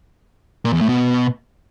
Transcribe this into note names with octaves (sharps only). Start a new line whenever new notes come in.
A#2
E2
A2
B2